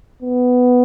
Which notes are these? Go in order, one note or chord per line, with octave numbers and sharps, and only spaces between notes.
B3